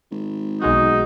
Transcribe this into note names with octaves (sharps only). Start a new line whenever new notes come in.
G#1
B1 G#3 D#4 F#4